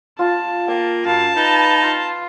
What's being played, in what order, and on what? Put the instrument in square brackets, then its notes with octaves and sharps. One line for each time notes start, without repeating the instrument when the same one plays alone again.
[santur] F4 [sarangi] A5
[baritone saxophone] A#3 [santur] G5
[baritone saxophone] F#2 [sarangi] F5 [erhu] A5
[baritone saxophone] D#4 [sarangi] B4
[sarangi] F4